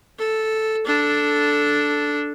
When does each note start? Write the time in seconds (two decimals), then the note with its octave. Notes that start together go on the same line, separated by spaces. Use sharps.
0.19 A4
0.86 D4 A4